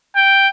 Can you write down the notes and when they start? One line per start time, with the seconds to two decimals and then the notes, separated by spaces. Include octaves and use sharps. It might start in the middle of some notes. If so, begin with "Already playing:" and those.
0.16 G5